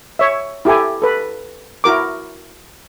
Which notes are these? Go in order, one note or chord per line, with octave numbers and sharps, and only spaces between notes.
C#5 E5
E4 G4 A4 G#5
A4 B4
E4 F#4 A#4 D6